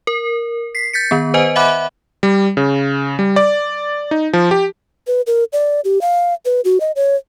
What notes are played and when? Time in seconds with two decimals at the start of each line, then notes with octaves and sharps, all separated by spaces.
0.07 A#4
0.75 B6 C7
0.93 G6 A6 B6 C#7
1.11 D#3 B3
1.34 B4 C5 D#5 G#5
1.56 E5 F#5 B5 D6 F#6
2.23 G3
2.57 C#3
3.19 G3
3.36 D5
4.11 D#4
4.33 F3
4.51 G4
5.07 B4
5.27 A#4
5.53 D5
5.85 G4
6.01 F5
6.45 B4
6.65 F#4
6.80 D#5
6.96 C#5